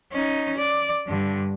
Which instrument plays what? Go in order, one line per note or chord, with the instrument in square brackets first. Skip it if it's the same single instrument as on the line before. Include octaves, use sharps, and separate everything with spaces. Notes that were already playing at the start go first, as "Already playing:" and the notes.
[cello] C#4 D#4
D5
G2 D3